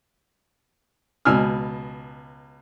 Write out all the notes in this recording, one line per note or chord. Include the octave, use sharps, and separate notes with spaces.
C#2 B2 G#5 E6 F6